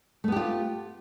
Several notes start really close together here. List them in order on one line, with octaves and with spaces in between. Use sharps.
A3 B3 G4 F4